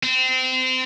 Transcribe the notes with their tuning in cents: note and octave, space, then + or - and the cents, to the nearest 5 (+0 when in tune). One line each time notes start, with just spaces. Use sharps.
C4 -25